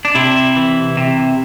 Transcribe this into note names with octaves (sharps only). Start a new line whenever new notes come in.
D4
C3 E4
E3
C3